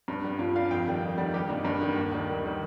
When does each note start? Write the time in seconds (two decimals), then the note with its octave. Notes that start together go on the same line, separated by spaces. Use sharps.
0.08 G2
0.24 G3
0.39 G2 F4
0.56 G3 F5
0.71 F2 G5
0.87 D#3 G3
1.02 F2
1.18 D#3 G3
1.33 G2 G4
1.49 D#3 G3 A#3
1.65 G2
1.81 D#3 G3
1.96 D#2
2.12 D#3 G3
2.28 D#2
2.44 D#3 G3